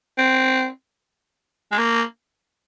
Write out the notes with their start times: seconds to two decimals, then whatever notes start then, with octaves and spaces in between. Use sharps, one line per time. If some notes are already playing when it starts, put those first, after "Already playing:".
0.18 C4
1.72 G#3
1.78 A#3